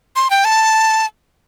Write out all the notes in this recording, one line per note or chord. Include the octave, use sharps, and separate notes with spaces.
C6
G5
A5